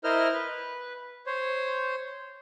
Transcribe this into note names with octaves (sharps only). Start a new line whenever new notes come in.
E4 A#4 C5 D#5 C6 F6
B4
C5 C#5